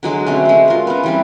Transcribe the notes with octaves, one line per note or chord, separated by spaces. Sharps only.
D3 F#3 G#3 D6
B2 A3 C4 C#4
B2 G#3
F4 A#4
B3 C#4
E3 G3 C4